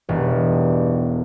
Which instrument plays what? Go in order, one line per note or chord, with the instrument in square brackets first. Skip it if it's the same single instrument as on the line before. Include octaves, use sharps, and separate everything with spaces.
[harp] E1 [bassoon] G2